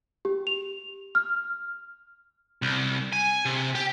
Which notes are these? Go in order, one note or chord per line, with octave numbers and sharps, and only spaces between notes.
G4
F7
F6
C2
G#5
C3
G4